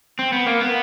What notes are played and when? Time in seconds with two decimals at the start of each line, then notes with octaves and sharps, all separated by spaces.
0.19 C4
0.33 B3
0.46 A#3
0.60 B3